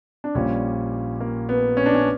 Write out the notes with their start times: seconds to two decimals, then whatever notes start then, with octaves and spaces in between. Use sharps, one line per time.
0.24 D4
0.35 A#1 A#2 G3 C#4
1.20 A#3
1.49 B3
1.77 C#4
1.86 D4
1.95 C#4